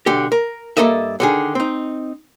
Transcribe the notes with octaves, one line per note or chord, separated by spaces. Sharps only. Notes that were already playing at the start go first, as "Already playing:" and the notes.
B1 D3 G4
A#4
G2 A#2 A#3 A4 D#5 E5
D3 D#3 G#4
C4 D#4